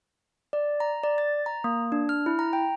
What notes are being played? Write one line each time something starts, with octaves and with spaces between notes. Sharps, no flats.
D5
A#5
D5
A6
A#5
A#3
D4
F6
E4
A#5
G5